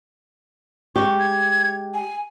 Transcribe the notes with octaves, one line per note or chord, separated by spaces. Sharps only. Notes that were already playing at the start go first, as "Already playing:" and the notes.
G#3 G4 C#6
G#6
G#5